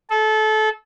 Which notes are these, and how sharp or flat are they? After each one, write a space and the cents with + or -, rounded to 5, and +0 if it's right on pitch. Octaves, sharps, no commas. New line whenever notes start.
A4 -25